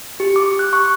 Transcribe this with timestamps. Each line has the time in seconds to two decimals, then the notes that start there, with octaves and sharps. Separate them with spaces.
0.20 G4
0.36 D6
0.59 F#6
0.73 C#6